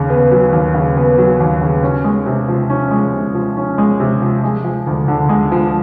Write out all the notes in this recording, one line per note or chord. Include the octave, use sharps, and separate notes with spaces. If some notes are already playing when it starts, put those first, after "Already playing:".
Already playing: D#2 C#3
B3
F#3
D#2
C#3
B3
F#3
D#2
C#3
C#4
G#3
C3
F3
C#4
G#3
C3
F3
C#4
G#3
C3
F3
G#3
F3
D2
D3
G#3
F3